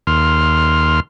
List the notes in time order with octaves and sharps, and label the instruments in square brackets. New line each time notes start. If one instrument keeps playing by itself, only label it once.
[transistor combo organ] D#2 C6 F6